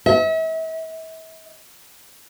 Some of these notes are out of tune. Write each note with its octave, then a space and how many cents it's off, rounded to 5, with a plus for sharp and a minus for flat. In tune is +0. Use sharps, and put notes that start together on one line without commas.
E5 -40